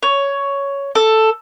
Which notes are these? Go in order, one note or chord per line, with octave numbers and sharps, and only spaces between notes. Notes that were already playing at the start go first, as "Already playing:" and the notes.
C#5
A4